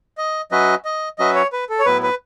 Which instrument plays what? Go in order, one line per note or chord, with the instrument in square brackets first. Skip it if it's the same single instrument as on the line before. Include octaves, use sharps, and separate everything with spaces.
[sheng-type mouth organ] D#5
[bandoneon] F#3 C#4 F#4 B4 E5 [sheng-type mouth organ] D#5
[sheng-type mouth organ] D#5
[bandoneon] F#3 C#4 F#4 B4 E5 [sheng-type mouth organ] D#5
[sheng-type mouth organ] C#5
B4
A4
C#5
[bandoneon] A2 F#3 B3 E4 [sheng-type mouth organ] B4
[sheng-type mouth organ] B4